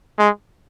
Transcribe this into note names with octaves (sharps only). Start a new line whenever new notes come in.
G#3